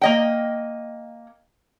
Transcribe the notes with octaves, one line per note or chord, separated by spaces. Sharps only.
A#3 D#5 G5